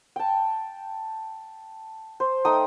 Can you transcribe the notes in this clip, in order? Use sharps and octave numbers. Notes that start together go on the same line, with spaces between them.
G5 A5
C5
A3 D#4 G5 D#6